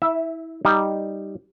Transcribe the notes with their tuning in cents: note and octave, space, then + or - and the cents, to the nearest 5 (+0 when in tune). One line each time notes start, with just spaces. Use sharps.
E4 -25 E5 +0
G3 +0 D#4 +0